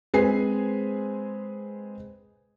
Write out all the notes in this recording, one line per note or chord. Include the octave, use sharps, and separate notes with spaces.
G#3 C4 G#4 B4 G#5 C7